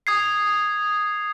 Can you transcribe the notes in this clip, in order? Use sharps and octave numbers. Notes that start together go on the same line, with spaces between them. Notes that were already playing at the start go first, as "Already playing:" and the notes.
D#6 G#6 C7